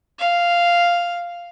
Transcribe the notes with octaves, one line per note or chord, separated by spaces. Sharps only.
F5